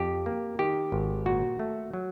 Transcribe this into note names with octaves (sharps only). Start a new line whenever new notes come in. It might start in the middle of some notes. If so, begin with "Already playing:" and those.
Already playing: F2 G4
A#3
D#3 G4
G#1
A#2 F#4
A3
F#3